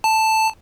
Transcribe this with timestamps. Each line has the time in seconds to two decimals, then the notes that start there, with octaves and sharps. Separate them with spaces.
0.04 A5